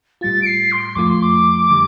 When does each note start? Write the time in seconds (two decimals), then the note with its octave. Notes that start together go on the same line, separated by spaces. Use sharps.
0.21 A2 G3 F4 A6
0.42 D7
0.46 C7
0.71 C6
0.95 F2 F3 A3 F4 D6
1.09 C6
1.22 D6
1.70 D3 G3